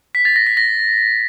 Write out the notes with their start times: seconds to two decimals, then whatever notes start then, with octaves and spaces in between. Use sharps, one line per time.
0.15 B6
0.25 A6
0.36 A#6
0.47 B6
0.57 A#6